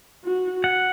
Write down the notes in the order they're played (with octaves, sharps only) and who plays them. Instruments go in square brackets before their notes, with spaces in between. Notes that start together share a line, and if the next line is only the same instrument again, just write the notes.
[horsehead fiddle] F#4
[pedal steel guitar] F#5